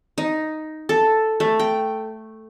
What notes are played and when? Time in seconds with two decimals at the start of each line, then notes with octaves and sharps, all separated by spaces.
0.18 D#4
0.89 A4
1.40 A3
1.59 G5